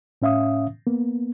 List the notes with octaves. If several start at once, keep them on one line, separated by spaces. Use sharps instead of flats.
A2 C#4 E5 F5 D#6
A#3 B3